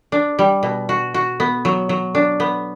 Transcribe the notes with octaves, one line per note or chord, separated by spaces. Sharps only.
D4
G3
B2
F#4
F#4
B3
F#3
F#3
D4
B3